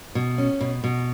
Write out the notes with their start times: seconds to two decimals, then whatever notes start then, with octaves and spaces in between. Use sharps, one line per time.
0.15 B2
0.38 C#4
0.61 B2
0.84 B2